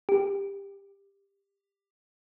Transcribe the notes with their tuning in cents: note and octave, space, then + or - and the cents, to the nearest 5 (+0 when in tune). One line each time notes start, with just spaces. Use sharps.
G4 +20